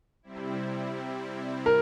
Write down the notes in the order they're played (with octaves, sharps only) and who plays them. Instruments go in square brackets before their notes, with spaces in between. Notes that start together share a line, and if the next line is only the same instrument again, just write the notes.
[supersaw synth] C3 G3 C4 E4
[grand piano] A#4